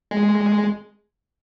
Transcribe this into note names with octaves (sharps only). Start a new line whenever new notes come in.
G#3